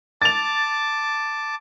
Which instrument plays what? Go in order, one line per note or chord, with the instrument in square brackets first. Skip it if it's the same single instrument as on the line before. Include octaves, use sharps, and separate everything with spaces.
[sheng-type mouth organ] A5 D6 [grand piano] A6 F7